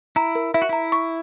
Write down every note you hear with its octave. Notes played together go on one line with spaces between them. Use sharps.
E4 A#5
A#4
E4 E5
F#4
E4 A#5
C#6